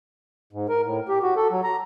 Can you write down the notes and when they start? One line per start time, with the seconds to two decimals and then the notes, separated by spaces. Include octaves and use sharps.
0.53 G#2
0.69 A#4
0.84 A2
1.09 G4
1.23 F#4
1.36 A4
1.51 F#3
1.64 A#5